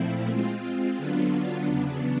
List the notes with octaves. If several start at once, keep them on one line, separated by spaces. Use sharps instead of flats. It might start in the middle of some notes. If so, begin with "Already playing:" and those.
Already playing: A#2 F3 A3 C4 E4
G#3 C4 F4
D3 F#3 B3 D4 F4
E2 C#3 F#3 B3 D4